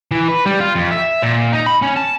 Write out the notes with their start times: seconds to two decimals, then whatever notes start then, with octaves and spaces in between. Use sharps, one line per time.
0.12 E3
0.29 B4
0.46 G3
0.61 F4
0.75 F2
0.91 E5
1.22 A#2
1.52 D#4
1.66 B5
1.82 C#4
1.96 A5